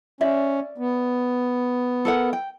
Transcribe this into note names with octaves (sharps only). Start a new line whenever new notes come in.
C#4 D5 E5
B3
A4 A#4 F#5
G5